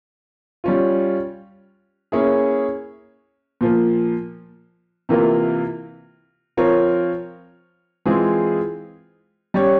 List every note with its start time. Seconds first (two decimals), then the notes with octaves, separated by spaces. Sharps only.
0.64 G3 C#4 F4
2.12 A#3 C#4 E4 G#4
3.61 A#2 F3 A#3
5.09 C3 E3 A#3 F4 A#4
6.57 F3 C4 F4 A#4 C#5
8.06 E3 G#3 C4 F4 G#4
9.54 G3 C#4 G4 C#5